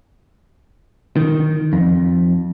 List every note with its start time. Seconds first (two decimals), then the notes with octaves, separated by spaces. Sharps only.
1.17 D#3
1.73 F2